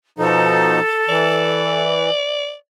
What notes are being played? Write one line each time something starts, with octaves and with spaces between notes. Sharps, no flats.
B2 F3 D#4 A4
E3 D5